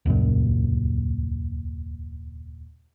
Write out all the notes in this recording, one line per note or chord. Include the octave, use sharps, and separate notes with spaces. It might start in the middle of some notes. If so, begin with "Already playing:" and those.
D#1 C#2 F#2 A#2